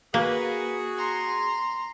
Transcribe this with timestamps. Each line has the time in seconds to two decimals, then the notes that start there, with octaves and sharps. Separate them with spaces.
0.14 A#3 F#4 G#4 A#4 B4
0.97 A#5 C6